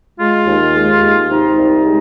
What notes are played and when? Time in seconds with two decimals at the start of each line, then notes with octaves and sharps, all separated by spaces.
0.18 G#3 F4
0.47 D#2
0.74 G#3
1.02 D#2
1.29 C3 D#4
1.58 C2
1.85 G#3